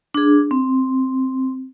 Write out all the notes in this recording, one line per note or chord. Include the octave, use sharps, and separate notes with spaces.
D4 G#4
C4